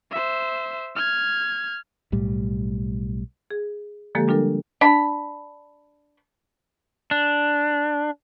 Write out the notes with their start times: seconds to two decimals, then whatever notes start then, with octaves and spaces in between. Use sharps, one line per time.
0.11 C5 E5
0.95 F6 G#6
2.12 B1 A2 G3
3.50 G#4
4.15 D3 F3 G#3 A#3 G4 A4
4.28 G3 D4 F4 A4 A#4
4.81 D4 B5
7.11 D4